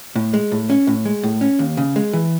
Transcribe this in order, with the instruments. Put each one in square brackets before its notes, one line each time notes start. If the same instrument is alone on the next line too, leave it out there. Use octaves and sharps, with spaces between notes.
[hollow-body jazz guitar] A2
G#3
A2
C#4
A2
G#3
A2
C#4
D#2
C#3
G#3
E3